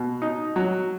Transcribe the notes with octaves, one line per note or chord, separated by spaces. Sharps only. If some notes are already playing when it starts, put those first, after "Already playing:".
Already playing: B2
D#4
F#3